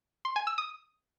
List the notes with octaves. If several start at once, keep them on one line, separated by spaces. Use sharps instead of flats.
C6
G#5
E6
D#6